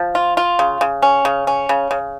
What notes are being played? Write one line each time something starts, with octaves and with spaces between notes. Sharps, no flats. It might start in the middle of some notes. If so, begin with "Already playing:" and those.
Already playing: F3
F4
F4
C#3
C#3
C#4
C#3
C#4
C#3
C#3